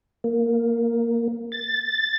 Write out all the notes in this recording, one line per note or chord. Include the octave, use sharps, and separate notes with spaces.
A#3
A6